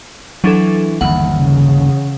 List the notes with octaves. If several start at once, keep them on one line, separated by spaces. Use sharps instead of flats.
E3 F#3 D4 A4
G1 D#2 E3 F#5
C#3